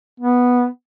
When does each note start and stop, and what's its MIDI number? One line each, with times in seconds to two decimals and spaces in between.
0.20 0.67 59